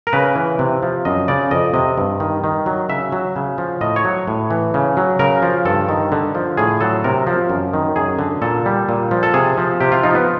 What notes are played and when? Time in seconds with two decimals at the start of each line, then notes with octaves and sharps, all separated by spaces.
0.07 A#4
0.13 C#3 B4
0.36 E3
0.59 C3
0.83 F3
1.05 F#2 D#5
1.28 C#3 D5
1.51 F2 D#5
1.74 C3 D#5
1.98 G2
2.20 D#3
2.44 D#3
2.66 F#3
2.89 C#3 E5
3.12 F#3
3.36 C#3
3.58 F3
3.81 A2 D#5
3.96 C#5
4.05 F#3
4.28 A2
4.50 E3
4.74 C#3
4.97 F#3
5.19 C#3 A#4
5.42 F3
5.65 G2 A4
5.89 D#3
6.12 D3
6.35 F3
6.57 A2 G#4
6.81 F#3 A4
7.04 C3 A#4
7.27 F3
7.49 F#2
7.74 D#3
7.96 F#2 G#4
8.19 D3
8.42 A#2 A4
8.66 G3
8.89 A#2
9.11 F3
9.23 A4
9.34 C3 G#4
9.58 F3
9.80 C3 G4
9.92 F4
10.03 F3 D#4
10.15 B3